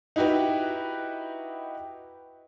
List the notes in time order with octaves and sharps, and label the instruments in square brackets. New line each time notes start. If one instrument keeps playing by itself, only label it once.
[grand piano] D#4 E4 F#4 G4 B4